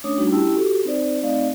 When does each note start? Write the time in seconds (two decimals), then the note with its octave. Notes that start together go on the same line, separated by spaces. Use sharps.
0.04 A3 C#4 D4 C#5 D6 D#6
0.18 G3 A3 D4 D#4 F#4
0.31 C#4 E4 G4 G5 A5 E6
0.55 F#4 G4 A4
0.85 C4 D#4 C5 D5
1.23 A3 C4 D#4 D5 D#5 F5